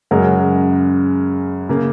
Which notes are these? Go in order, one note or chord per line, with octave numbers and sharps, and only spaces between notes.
F#2 C#3 G#3 F#4 A#4
C#3 A#3